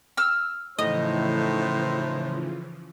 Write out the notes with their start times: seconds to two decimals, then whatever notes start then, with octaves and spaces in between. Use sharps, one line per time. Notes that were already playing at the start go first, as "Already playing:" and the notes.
0.17 E6 F6
0.79 A2 C#3 E3 F3 D#4 C5 D#5